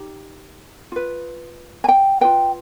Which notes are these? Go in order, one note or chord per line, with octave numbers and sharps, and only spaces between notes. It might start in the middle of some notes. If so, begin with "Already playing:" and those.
Already playing: D#4 G4
F4 B4
G#5
G5
F4 G#4 B4 G5